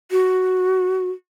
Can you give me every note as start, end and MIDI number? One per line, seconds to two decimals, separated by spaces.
0.11 1.10 66